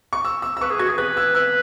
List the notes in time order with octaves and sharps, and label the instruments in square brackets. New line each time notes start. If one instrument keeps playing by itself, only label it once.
[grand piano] C#6
E6
E6
E6
[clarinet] B4 [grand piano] C#6
[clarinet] G#4
[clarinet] F#4 [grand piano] G#6
[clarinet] G#4
[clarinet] B4 [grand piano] G#6
[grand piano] E6
[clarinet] B4 [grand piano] E6